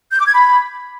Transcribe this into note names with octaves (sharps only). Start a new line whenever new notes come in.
G6
D6
G#6
B5